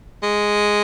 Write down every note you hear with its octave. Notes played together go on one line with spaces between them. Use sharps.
G#3